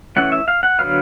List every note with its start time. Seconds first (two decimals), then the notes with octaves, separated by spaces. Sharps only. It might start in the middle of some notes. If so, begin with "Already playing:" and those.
0.16 E3 A3 C#4 E4 F#5
0.32 E5
0.48 F5
0.63 F#5
0.79 D3 F#3 B3 F5